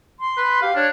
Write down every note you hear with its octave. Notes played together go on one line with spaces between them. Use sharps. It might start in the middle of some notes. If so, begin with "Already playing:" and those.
C6
B4
G4 F5
D4 C#5